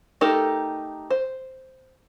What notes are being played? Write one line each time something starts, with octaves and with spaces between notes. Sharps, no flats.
A3 D#4 G4 A4 A#4
C5